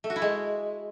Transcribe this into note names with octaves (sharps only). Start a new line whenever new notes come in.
A3
F#4
E4
G#3